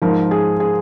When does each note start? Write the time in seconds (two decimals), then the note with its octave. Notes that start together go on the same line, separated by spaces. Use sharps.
0.02 G#2 F3 A#4
0.31 G#4
0.60 G#4